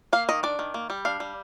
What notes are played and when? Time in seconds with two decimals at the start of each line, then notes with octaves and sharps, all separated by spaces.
0.13 A#3 F5
0.29 D#3 D#5
0.43 D4 D5
0.59 D#3
0.74 A#3
0.90 G3
1.05 D4 F5
1.20 G3